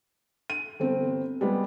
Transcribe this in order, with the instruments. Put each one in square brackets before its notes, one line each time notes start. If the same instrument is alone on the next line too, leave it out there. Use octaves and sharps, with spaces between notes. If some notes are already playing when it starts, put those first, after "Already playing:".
[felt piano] D#7
G1 C4
G3 G#3 B3